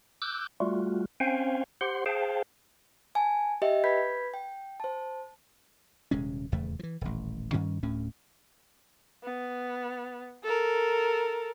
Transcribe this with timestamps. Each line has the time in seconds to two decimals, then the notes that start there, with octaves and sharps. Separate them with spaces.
0.22 D6 E6 F#6 G6
0.60 G3 A3 F4 F#4
1.20 C4 C#4 C5 F5 G5 G#5
1.81 G4 C5 F#5 C6
2.06 G#4 C5 F5 G5 A5
3.15 G#5 A5
3.62 G4 D#5 E5 G5
3.84 B4 B5 G6 G#6 B6
4.34 G5
4.80 C5 A5
6.11 D#1 C3 G#3 C#4
6.52 D#1 E2 C#3 A3
6.79 E3 F3
7.01 D#1 A1
7.53 G2 D#3 G3 C#4
7.83 D1 D2 A2 C#4
9.24 B3
10.44 A4 A#4